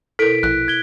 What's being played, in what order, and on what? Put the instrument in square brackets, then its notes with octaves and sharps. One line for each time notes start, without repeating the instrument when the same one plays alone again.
[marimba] B2 E4 [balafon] A4 A#4 [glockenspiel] B6 D7
[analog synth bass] A#1 [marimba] E4 [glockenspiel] F#6
[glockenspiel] G#6 G7